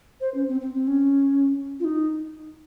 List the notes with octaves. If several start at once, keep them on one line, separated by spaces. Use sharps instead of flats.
C5
C#4
C4
C4
C4
C#4
F4
D#4